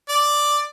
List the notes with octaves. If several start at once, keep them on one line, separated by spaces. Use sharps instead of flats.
D5